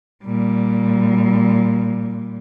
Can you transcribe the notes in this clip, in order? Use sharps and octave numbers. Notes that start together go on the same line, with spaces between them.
A#2 G3